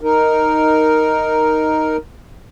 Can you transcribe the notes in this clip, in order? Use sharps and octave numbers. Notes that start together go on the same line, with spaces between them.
D#4 A#4